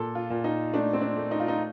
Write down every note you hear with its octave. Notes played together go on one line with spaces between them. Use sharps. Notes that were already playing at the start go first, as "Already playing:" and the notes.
Already playing: A#2 A4
F4
A#2
D#4
A3 D4
C4
D4
A3
D#4
F4
D#4